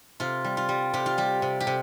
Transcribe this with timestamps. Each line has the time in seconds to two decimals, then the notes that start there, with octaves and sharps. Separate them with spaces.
0.20 C3 F4
0.44 G3
0.57 F4
0.69 G3
0.94 C3 G4
1.06 F4
1.18 G3 G4
1.42 C3
1.60 G4
1.67 C3